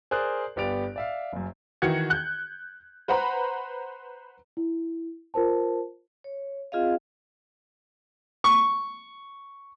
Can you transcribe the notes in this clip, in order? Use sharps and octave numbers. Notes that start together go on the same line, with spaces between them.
G#4 A#4 C5 D5 D#6 F#6
G1 B3 G4 D5 D7 F7
D5 E5 F5
F#1 F#2
D#3 E3 F#4 G#6 C#7
F#6 G6
B4 C5 F#5 A#5 B5
E4
F4 A#4 C5 A5
C#5
C4 F4 G#4 D#5 F5
C#6